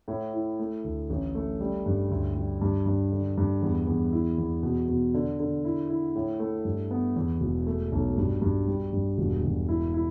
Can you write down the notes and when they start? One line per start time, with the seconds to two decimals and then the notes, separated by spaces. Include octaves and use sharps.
0.08 A2
0.33 E4
0.59 A3
0.84 D2
1.10 A1
1.35 A3
1.61 G3
1.86 G2
2.10 D2
2.35 G3
2.61 G2
2.86 G2
3.12 D3
3.37 G2
3.62 E2
3.87 E2
4.12 E4
4.38 E2
4.63 B2
4.88 B2
5.14 D3
5.39 D3
5.65 E4
5.89 E4
6.15 A2
6.40 A3
6.65 G2
6.91 B3
7.16 E2
7.41 E1
7.67 A3
7.92 B1
8.17 G2
8.42 G2
8.67 G3
8.93 G2
9.18 E1
9.43 E1
9.69 E4
9.94 E4